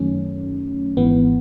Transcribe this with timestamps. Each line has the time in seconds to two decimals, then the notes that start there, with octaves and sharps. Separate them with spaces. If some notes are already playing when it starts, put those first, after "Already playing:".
Already playing: F#2 D#3 F#3 A3 C#4
0.97 G#1 G#2 E3 B3